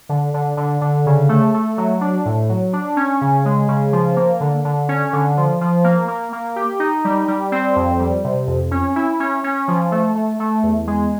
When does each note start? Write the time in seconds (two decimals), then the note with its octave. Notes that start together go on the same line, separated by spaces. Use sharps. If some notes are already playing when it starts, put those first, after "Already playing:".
0.09 D3
0.34 D3
0.57 D3
0.81 D3
1.06 C#3
1.29 A3
1.54 A3
1.78 F#3
2.01 D4
2.26 A2
2.49 F#3
2.73 D4
2.97 C#4
3.21 C#3
3.45 G#3
3.68 C#3
3.93 F3
4.16 A#3
4.40 D3
4.65 D3
4.89 C#4
5.13 D3
5.37 F3
5.61 F3
5.84 A#3
6.08 A#3
6.33 A#3
6.56 G4
6.80 D#4
7.05 G3
7.28 G3
7.52 C4
7.76 F2
7.99 G3
8.24 C3
8.47 F2
8.71 C#4
8.96 E4
9.20 C#4
9.44 C#4
9.68 F3
9.92 A3
10.15 A3
10.40 A3
10.63 E2
10.87 G#3